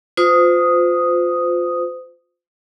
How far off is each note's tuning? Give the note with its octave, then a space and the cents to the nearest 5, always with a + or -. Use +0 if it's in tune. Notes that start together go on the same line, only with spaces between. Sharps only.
F4 +20 C5 -35 D#6 +0